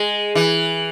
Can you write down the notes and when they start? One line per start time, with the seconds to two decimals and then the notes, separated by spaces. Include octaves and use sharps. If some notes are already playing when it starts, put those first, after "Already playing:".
Already playing: G#3
0.35 E3